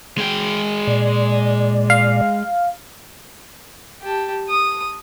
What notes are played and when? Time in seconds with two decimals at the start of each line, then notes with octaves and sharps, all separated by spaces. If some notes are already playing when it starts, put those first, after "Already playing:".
0.18 G#3 G5
0.87 A#2 D5
1.90 F5
4.02 G4 A5
4.49 D#6